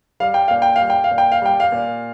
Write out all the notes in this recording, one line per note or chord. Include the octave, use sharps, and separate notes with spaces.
G3 F5
G5
A#2 F5
G5
F5
G3
G5
F5
A#2
G5
F5
G3 G5
F5
A#2